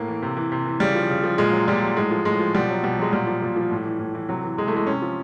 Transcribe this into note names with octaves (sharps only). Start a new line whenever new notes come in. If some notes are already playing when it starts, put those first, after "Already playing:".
Already playing: A2 A#3
E3
C3
E3
C3
E3
C#3 G3
F3
C#3
F3
A#2 G#3
F#3
A#2 G3
F#3
A2 G#3
F3
A2 G#3
F3
B2 G3
F#3
B2 G3
F#3 G#3
A#2 G3
F3
A#2
F3
A2
E3
A2
E3
C3 F#3
E3
C3 G#3
A3
E3 G#3
C3 C#4
F3